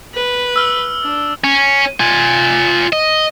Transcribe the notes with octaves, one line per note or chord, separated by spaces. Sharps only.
B4
E6 F6
D4
C#4
F4 G#5
D#5